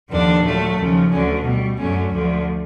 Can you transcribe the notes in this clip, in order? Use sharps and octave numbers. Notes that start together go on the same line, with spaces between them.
D#2 D3 F3 D4
A#2 F#3 A3
D#2 C#3 F3
D2 D3 F#3 C#4
B2 G3
F#2 D3 F#3 A3 C#4
D2 D3 F3 A3